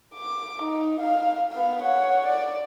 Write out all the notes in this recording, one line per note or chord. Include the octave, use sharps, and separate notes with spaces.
D6
D#4
F5
B3 F5
C#5 F#5
D5